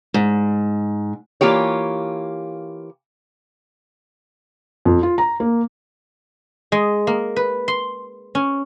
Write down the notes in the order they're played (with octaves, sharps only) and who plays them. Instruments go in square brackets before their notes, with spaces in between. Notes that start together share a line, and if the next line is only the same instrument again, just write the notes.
[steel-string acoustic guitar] G#2
[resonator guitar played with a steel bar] E3 A#3 F4 G4 C#5
[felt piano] F2
F4
A#5
A#3
[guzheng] G#3
A#3
B4
C6
C#4